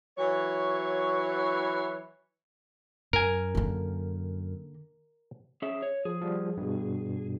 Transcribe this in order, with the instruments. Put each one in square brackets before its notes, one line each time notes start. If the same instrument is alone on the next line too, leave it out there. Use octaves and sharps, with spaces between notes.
[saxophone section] E3 F#3 C#5
[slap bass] F#2 [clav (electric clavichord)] A#4 G#5
[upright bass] D3 A#3
[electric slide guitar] C#4 G#4 E5
C#5
[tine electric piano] F3 [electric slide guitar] G#4
[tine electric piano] F3 G3
G2 B2